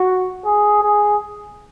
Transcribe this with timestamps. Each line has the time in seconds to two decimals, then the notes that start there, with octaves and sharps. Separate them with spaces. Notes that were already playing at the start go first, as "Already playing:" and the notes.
Already playing: F#4
0.45 G#4
0.83 G#4